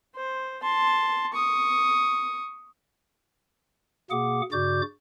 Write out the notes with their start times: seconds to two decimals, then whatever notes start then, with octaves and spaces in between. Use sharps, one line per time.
0.15 C5
0.63 A5 C6
1.33 C#6 D#6
4.11 B2 A#3 G#4 F#5 D6
4.52 G2 C#3 F#4 D5 D6 G6